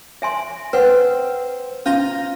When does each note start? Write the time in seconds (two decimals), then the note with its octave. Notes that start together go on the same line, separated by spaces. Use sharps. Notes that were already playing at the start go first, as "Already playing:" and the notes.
0.22 E5 G#5 C6
0.73 C4 B4 F#5
1.86 C#4 F4 A#5